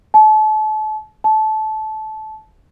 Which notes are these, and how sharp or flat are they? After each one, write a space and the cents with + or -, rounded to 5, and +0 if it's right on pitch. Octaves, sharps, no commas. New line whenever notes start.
A5 -35
A5 -20